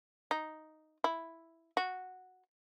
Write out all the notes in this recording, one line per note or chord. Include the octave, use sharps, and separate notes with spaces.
D#4
E4
F#4